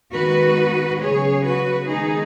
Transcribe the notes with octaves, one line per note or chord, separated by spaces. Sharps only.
D#3 G#3 B3 F#4 B4
C#3 F#3 B3 G#4 C#5
F#4 B4
D#3 G#3 B3 D#4 G#4